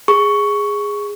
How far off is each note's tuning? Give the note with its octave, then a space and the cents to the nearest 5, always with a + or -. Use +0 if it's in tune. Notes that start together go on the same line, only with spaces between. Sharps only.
G#4 -10 C#6 +10